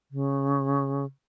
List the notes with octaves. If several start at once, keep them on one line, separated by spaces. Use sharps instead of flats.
C#3